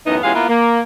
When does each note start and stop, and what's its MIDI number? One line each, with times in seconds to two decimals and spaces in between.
0.06 0.17 42
0.06 0.17 45
0.06 0.17 52
0.06 0.17 59
0.06 0.17 63
0.06 0.17 75
0.23 0.33 40
0.23 0.33 56
0.23 0.33 61
0.23 0.33 65
0.23 0.33 67
0.23 0.33 77
0.34 0.48 58
0.34 0.48 59
0.34 0.48 64
0.34 0.48 65
0.48 0.80 58